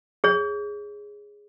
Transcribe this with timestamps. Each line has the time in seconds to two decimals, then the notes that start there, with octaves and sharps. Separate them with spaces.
0.24 G#4 C#5